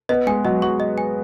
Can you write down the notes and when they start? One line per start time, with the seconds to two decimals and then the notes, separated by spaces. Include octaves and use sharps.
0.09 B3 B4 D#5
0.27 G#3 G#4 G#5
0.45 F#3 F#4 D#5
0.62 F#3 F#4 C#6
0.80 D#5
0.98 G#5